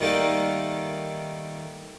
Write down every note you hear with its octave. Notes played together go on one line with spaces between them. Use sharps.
D#3 G3 A3 A#3